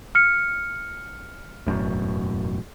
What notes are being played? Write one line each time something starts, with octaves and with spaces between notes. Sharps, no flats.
F6 C#7
E1 F#2 A2